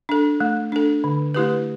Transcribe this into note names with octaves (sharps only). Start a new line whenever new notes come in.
D4 A4
A3
D4 A4
D3
A3 E4 G4 B4